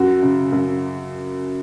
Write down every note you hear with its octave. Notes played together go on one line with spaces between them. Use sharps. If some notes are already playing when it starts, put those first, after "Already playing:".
Already playing: F#2 F#4
C#3
F#2